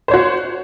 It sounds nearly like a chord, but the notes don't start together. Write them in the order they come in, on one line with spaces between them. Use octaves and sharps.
C5 C#5 F#4